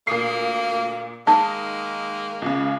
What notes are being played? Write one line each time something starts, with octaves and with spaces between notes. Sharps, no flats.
D2 A#2 A#3 D#6 C7
D#3 G#3 A#3 D#4 A5
C#2 C#3